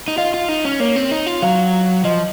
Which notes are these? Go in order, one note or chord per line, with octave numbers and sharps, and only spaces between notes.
D#4
F4 D#5
F4
D#4
C#4
A#3 C#5
C4
D#4
F4
F#3 F5
F3 D#5